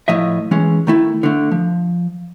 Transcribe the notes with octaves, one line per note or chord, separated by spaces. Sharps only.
A2 F3 D#5 E5
E3 G#3 C#4
D#3 A3 E4
D3 A3
F3